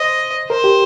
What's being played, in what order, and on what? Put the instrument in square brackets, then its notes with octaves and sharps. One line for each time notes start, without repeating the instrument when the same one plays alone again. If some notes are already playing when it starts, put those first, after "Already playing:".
Already playing: [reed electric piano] C5 [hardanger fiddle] D#5
[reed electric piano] A#4 [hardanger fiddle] C5
[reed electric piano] G4